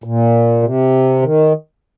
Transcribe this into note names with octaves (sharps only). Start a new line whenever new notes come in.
A#2
C3
D#3